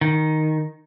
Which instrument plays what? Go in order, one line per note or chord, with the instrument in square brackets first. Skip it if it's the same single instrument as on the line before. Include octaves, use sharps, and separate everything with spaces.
[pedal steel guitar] D#3